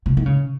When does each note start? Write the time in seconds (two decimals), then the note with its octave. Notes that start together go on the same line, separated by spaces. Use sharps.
0.06 C3
0.17 D#3
0.26 C#3